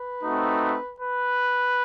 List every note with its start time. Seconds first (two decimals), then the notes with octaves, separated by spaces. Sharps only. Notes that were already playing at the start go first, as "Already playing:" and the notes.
Already playing: B4
0.24 A3 C4 D#4 F#4
1.01 B4